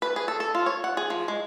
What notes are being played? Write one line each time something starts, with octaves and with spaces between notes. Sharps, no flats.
B4
G#4
A4
A4
F4
C#5
F#5
G#4
F3
G#3